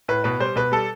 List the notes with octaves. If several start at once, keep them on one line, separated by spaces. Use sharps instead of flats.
A2 B4
B2 B4
G3 C5
B2 B4
G3 A4